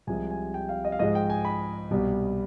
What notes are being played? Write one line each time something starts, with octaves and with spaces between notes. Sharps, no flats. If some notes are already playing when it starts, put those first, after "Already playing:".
C2 C3 F3 G#3 G#5
G#5
G5
F5
D#5
F5
G#2 F3 G#3 D#5
G5
G#5
B5
C2 B2 G3